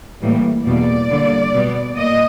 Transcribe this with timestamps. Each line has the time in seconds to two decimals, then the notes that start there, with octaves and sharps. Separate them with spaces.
0.22 A2 E3 G3 A#3
0.66 E2 B2 G3 A#3 D5
1.10 D3 G3 A#3
1.53 B2 G3 B3
1.97 A#2 D#5